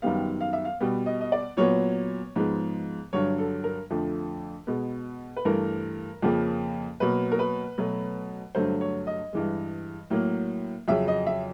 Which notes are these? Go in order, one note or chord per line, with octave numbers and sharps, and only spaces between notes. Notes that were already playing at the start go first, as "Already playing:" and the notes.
F#2 D#3 G3 B3 F5
F5
E5
F5
B2 G3 B3
D#5
D#5
D5
A#2 F#3 B3 C#5
G#2 F3 G#3 B3
G2 D3 F#3 C#5
A4
A#4
F2 D3 F3 A3 A4
B2 G#3 B3
B4
G2 E3 A3 A#4
F2 C#3 F3 A#3
B2 F#3 A#3 B4
A#4
B4
B2 F#3 A3
G2 D3 F#3 A3 C5
C#5
D#5
G2 E3 G#3
A2 F#3 A#3
F2 C#3 F#3 E5
D#5
E5